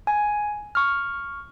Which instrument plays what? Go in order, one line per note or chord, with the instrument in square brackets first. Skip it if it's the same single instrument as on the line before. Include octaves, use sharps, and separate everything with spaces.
[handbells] G#5
C#6 F6